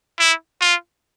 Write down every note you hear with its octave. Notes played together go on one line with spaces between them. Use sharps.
E4
F4